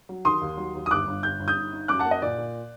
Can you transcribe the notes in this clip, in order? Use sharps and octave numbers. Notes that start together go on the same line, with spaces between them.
F#3
D#3 C6 D#6
D#2
F#3
D#2
D#6
G1 D6 F#6
G1
G1 G6
G1
D#6 G6
D#4
D#4
F#2 D6 F#6
F#5 A5
A#3
D#5
A#2 D5
A#2